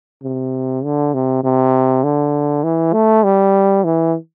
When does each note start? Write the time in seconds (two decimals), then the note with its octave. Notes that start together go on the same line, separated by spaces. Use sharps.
0.23 C3
0.84 D3
1.14 C3
1.44 C3
2.04 D3
2.64 E3
2.93 A3
3.24 G3
3.84 E3